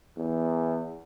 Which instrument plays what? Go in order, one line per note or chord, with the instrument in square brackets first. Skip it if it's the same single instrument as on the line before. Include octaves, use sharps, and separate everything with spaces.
[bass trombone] E2